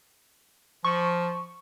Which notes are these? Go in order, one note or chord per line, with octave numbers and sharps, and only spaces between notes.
F3 C#6